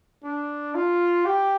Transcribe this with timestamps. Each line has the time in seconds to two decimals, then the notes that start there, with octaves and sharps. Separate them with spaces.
0.24 D4
0.75 F4
1.25 G4